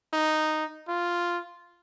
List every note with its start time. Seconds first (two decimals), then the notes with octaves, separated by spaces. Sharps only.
0.13 D#4
0.88 F4